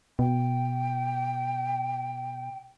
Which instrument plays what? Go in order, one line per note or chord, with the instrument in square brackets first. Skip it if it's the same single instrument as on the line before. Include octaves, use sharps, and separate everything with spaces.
[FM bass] B2 [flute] G5